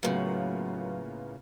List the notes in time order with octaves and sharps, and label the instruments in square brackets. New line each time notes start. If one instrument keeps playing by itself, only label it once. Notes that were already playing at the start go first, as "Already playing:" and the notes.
[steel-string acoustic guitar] A2 C#3 [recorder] F#3 [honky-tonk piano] A#3 B3 F4